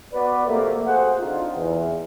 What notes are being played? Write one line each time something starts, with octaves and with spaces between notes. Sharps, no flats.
B3 F#4 B4 D5
F2 C3 A3 A#3
F#4 G#4 A4 C5 F#5
D3 C4 D#4 F4
E2